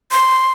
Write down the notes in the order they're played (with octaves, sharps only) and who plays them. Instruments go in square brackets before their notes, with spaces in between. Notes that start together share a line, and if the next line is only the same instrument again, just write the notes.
[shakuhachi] C6